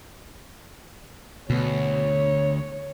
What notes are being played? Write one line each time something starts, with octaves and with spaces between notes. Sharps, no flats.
D2 B2 C#5